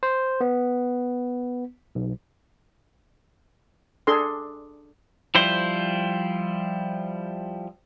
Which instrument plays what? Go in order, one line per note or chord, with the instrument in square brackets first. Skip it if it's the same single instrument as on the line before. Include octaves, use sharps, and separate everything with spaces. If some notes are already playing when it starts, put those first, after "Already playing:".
[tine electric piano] C5
B3
B1
[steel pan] D4 G#4 A4 C6
[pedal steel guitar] F3 G3 E4 C5